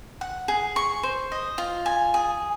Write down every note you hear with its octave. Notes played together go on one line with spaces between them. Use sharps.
F#5
G#4
C#6
C5
D#5
F4
G#5
G#4